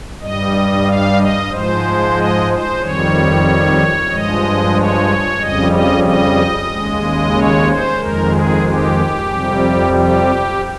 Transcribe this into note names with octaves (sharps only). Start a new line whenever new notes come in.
G2 G3 D#5
F5
D#5
G#2 F3 G#3 C5
D#5
C5
F2 D#3 G3 C#5
G2 F3 G#3 D#5
C#5
F2 C#3 G3 D#5
D#5
D#5
D#2 C#3 G#3
C#5
C5
F2 D#3 G#3 A#4
G#4
G4
F2 C3 G3
G4